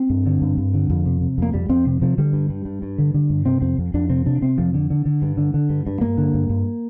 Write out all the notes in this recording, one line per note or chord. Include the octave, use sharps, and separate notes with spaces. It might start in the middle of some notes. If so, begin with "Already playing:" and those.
Already playing: C4
G2
D3
G2
G2
D3
F2
C3
C3
F2 A#3
F2 G3
F2 C4
C3
C3 F3
D3 G3
G2
G2
G2
G2
D3
D3
G2
C3 C4
F2 C4
F2
F2 D4
C3 C4
C3 D4
C3 C4
F2 F3
D3
D3
D3
G2
D3
D3
G2
G2
G2 A#3
D3
G2
G2